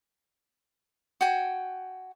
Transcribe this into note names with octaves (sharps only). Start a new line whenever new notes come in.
F#4 G5 G#5